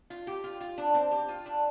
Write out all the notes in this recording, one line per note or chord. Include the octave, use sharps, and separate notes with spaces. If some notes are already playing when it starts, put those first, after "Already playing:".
F4
G4
F4
F4
D4
C4
G4
F4
D4